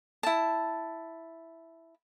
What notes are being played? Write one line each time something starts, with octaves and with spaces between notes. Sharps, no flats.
E4 A5